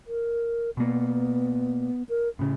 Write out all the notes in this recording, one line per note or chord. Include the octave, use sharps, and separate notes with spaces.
A#4
B2 A#3 B3
A#4
A2 C#3 C#4